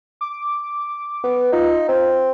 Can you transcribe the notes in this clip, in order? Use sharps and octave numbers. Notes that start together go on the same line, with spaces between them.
D6
B3
D#4 F4
C4